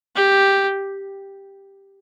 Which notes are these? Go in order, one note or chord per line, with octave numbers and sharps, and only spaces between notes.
G4